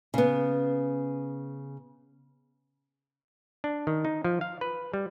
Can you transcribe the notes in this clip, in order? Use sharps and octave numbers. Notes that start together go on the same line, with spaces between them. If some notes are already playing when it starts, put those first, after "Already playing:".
C#3 B3
D4
D#3
D#4
F3
F5
B4
G3